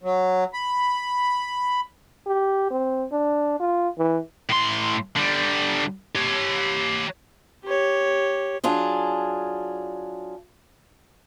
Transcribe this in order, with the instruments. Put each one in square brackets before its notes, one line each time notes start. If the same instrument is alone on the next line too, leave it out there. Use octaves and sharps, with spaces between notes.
[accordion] F#3
B5
[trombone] G4
C4
D4
F4
E3
[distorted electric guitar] A2 C6
D3 G3
G4 C#5
[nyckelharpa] G4 C#5
[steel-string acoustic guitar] F#3 D4 F4 G#4